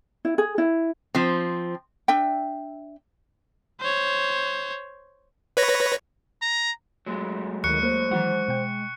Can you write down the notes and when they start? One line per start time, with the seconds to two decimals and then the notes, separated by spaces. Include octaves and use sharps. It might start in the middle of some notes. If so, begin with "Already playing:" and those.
0.25 E4
0.38 G#4
0.58 E4
1.15 F3 C4
2.08 D4 E5 G5
3.80 C5 C#5
5.57 B4 C#5 A#6
6.42 A#5
7.06 F#3 G#3 A3
7.64 D2 D#3 C#6 F#6 C#7
7.83 A#3 C5
8.11 D#3 E3 F#3 G#3 F#5
8.48 B2 G5